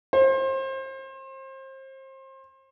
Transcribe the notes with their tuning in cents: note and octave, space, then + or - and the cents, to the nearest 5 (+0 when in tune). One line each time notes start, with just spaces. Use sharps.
C5 +30